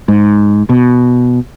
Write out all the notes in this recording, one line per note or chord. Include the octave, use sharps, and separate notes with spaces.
G#2
B2